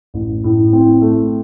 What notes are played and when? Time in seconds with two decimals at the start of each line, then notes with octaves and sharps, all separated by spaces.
0.14 A1
0.44 A2
0.73 C4
1.01 A3